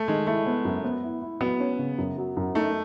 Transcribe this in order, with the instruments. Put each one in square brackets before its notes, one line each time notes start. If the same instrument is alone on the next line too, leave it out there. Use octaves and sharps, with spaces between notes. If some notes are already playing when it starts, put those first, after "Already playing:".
Already playing: [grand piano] A3
[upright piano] D#3 [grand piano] G#3
[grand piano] A3 [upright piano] E4
[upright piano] B3
F#2
B3
E4
E4
[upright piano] F#3 [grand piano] B3
[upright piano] C#4
C#3
F#2
F#3
F#2
[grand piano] A3 [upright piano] D#4